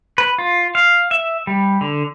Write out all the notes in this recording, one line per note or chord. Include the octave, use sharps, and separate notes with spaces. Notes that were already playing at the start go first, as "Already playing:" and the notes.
B4
F4
F5
E5
G3
D3